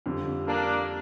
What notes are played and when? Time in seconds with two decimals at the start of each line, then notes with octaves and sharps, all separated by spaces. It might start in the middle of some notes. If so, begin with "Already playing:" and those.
0.06 F2 D3 G3
0.47 A#3 D4